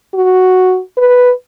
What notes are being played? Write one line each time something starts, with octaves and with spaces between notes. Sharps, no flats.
F#4
B4